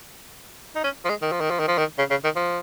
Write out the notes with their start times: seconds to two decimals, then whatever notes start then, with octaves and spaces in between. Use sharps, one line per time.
0.75 D#4
0.84 C#4
1.05 F3
1.09 G#3
1.22 D#3
1.32 F3
1.41 D#3
1.50 F3
1.60 D#3
1.68 F3
1.78 D#3
1.98 C#3
2.10 C#3
2.24 D#3
2.36 F3